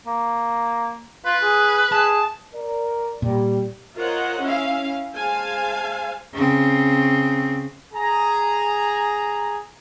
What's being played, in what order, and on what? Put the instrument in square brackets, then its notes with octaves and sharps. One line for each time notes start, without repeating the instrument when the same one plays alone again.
[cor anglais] A#3
[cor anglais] F4 [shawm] B4
[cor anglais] G#4
[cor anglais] G#4 [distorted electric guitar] A5
[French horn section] A#4 D5
[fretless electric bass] A#2 [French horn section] G3
[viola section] F4 A#4 C5 C#5 D#5 F#5
C#4 E4 F5
G#3 C5 F5 G#5 A5
[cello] C#3 C4
[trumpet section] G#4 A#5